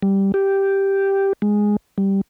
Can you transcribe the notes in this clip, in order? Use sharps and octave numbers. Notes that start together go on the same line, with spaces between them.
G3
G4
G#3
G3